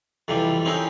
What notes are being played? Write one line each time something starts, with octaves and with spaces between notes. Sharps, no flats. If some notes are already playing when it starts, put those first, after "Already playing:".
F2 C3 E3 G3
C4 C#4 D#4 E4 A#4